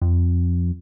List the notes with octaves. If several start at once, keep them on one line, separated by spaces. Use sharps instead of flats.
F2